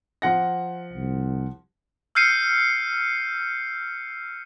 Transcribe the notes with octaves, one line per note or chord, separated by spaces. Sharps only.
F3 F#5 A#6
C2
E6 F6 G6 C7 C#7 D#7